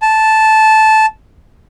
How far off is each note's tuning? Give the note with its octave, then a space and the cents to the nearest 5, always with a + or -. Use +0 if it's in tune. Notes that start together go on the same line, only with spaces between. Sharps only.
A5 -10